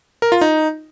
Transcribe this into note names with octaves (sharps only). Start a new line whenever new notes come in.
A#4
F4
D#4